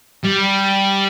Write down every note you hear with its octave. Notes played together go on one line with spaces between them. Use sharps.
G3